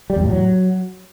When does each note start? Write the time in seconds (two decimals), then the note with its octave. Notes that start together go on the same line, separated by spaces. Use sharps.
0.10 G3
0.16 E2
0.23 A2
0.30 F#3